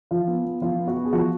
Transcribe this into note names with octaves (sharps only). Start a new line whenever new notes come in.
F3 F4
B3
B3
F3 F4
B3
F#4
B3
G#4
F3 F#4